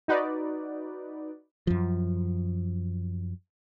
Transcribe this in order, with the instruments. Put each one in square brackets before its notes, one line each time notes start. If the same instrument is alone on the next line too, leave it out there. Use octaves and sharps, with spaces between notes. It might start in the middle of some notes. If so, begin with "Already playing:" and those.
[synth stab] D#4 F#4 B4 D5
[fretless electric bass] F#2 F3